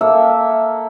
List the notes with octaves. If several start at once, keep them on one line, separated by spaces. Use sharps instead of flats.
A#3 A4 E5